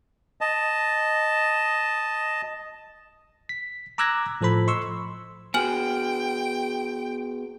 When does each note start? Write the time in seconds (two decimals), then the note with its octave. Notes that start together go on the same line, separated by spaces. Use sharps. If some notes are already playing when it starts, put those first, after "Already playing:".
0.41 D#5 A5
3.49 B6
3.98 A#5 D6 E6 F#6 G#6 A#6
4.41 A2 F3 A4 C5 B5
4.67 D#5 C6 C#6 E6
5.54 B3 F#4 G#4 G5 G#5 F6 F#7